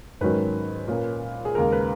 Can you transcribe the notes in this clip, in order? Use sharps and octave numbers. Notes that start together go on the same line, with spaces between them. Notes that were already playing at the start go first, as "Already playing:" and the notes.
G#2 D#3 F#3 C#4 B4
A#2 A#3 C#4
G#4
D#2 C#3 G#3 A#4
B4